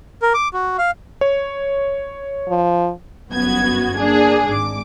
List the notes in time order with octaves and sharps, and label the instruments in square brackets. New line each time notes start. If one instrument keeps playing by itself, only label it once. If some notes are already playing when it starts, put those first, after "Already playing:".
[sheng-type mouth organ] A#4
D6
F#4
F5
[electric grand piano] C#5
[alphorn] F3
[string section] G1 F#2 B3 F#4 G#6
A#3 D4 G#4
G#1 G#2 D6